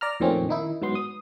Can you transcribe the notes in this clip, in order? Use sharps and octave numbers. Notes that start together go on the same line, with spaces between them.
D5 A#5 F6
F2 A#2 D#3 A3 C4 C#4
D#3 D#4 E4
G#2 F#3 B3 C6
D#6